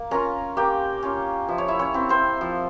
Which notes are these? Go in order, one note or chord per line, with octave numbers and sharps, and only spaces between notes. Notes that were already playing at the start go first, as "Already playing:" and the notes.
Already playing: A#3
C#4 F4 A#4 A#5
A#3 G4 G5
C#4 F4
F3 E5
C#5
E4 E5
C#4 C#5
C4 E4
C4 C5
F3